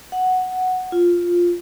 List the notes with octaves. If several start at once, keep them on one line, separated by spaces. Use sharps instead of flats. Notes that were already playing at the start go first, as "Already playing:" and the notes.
F#5
F4